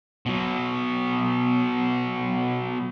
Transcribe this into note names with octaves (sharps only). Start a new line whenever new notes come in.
B2 F#3